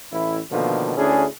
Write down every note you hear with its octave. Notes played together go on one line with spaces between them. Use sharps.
A1 E4
B2 D3 D#3 F3 A3 A#3
D2 C#4 D4 E4 G#4